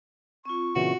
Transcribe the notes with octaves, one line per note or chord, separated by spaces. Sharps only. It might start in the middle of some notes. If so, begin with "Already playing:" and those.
C4 F4 C#6
A#2 C#3 E3 F#4